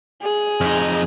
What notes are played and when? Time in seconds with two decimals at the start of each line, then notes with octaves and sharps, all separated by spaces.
0.22 G#4
0.61 F2 D#4